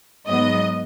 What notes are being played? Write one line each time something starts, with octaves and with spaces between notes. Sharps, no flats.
G#2 F#3 B3 D#5